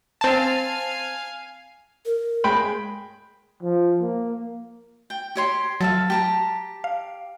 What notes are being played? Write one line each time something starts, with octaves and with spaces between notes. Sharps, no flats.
C4 F5 G#5 A5
A#4
G#3 G5 B5
F3
A#3
G5
G4 C#5 C6
F#3 A4 E5 F5
G4 G5 A5 A#5
F5